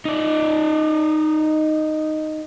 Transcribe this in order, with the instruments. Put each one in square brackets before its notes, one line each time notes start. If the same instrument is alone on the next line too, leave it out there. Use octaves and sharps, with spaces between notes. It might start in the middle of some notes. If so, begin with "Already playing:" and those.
[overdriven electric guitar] D#4 D5